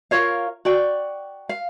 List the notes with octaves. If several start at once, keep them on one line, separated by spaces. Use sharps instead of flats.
F4 A#4 C#5 F5
F#4 D5 G5
F5